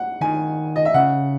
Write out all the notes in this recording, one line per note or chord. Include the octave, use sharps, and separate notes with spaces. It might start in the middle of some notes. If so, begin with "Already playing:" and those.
Already playing: F#5
D#3 G#5
D#5
E5
C#3 F#5